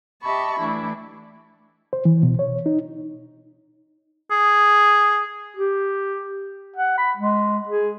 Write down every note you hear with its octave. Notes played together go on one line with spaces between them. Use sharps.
G4 D#5 E5 A5 B5 C#6
E3 A3 D4 E4
C5
E3
B2
C#5
D#4
G#4
G4
F#5
B5
G#3
G#4